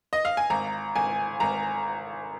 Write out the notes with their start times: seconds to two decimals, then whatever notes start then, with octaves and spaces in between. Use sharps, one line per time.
0.13 D#5
0.25 F5
0.37 G#5
0.50 G#1 A#5
0.96 G#1 G#5
1.40 G#1 A#5